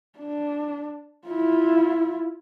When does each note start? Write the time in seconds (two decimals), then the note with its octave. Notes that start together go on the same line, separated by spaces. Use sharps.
0.19 D4
1.28 E4 F4